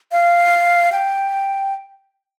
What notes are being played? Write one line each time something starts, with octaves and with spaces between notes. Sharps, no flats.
F5
G5